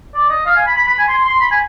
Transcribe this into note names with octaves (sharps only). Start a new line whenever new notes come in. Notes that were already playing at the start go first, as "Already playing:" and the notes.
D5
D#5
F5
G#5
B5
B5
B5
G#5
C6
C6
B5
G#5